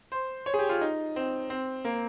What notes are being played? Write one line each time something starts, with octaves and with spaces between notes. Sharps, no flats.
C5
C#5
G#4
G4
F4
D#4
C4
C4
A#3